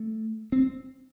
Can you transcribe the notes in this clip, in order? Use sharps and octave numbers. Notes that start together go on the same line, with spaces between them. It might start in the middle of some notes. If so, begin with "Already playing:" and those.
Already playing: A3
C4